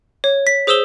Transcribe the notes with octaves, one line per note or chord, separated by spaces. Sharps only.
C#5
B6
G#4 C5 D#6 E6 E7 G7